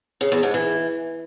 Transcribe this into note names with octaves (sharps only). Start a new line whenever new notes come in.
C#3
E2
G#2
E3